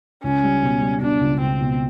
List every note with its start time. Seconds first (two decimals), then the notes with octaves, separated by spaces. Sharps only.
0.23 C#2 C#4
0.43 G3
0.63 B2
0.81 G3
1.01 B2 D4
1.21 C#2
1.41 C#2 C4
1.61 B2